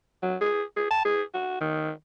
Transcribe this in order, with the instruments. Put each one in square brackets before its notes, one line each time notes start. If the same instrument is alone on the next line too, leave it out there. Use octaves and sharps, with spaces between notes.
[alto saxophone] F#3
G#4
G#4
A5
G#4
F#4
D#3